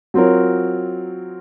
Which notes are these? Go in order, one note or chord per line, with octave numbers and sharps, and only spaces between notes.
F#3 C4 F4 A#4 C#5